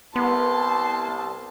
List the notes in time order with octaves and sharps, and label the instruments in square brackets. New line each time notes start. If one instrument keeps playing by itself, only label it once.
[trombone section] C2 [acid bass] B3 [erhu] A5 [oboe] C6